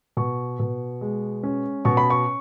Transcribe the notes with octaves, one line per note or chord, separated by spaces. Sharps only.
B2 C#6
B2
G#3
C#4
B2 C#6
B5
C#6